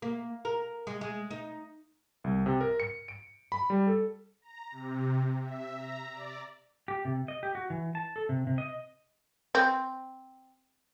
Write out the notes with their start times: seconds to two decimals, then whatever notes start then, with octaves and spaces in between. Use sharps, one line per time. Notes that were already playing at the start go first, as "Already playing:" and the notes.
0.02 A#3
0.45 A#4
0.87 G#3
1.01 G#3
1.31 D#4
2.24 C2
2.46 C3
2.61 A#4
2.80 C#7
3.08 D7
3.52 B5
3.70 G3
3.87 A4
4.42 A#5
4.71 C3
5.41 E5
5.75 A#5
6.12 D5
6.88 G4
7.05 C3
7.28 D#5
7.43 G4
7.55 F#4
7.70 E3
7.95 A5
8.16 A4
8.29 C3
8.47 C3
8.58 D#5
9.55 C4